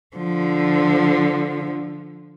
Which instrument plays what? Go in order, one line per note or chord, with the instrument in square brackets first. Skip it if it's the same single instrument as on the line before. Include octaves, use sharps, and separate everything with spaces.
[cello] D3 F3